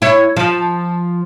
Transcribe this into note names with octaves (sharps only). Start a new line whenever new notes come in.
E4 C#5
F3